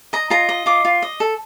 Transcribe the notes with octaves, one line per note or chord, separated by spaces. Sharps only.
D#5 A#5
F4 A#5
D#5
F4 D6
F4
D#5
A4